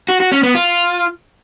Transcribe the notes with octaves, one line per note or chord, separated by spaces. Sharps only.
F#4
F#4
C#4
B3
F4